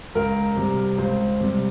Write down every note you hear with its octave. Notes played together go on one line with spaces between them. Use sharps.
C#2 A#4
C3 G3
C#2 C5
C3 G3